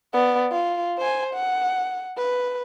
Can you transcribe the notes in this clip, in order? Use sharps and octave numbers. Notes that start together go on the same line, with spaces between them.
B3 D5
F4
C5 G#5
F#5
B4